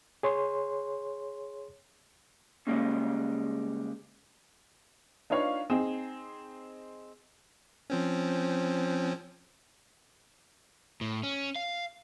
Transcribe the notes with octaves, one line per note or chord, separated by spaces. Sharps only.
G#4 C#5 C6
C#3 F3 G3 G#3 A#3 C#4
D4 D#4 F4 B4 C#5 F5
C4 D#4 G#4
F3 C4 C#4
A2
C#4
F5